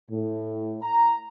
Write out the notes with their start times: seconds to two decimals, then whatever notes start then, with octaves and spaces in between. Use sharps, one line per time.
0.11 A2
0.83 A#5